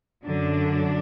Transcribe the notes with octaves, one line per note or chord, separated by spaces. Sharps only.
F#2 D3 F#3 D4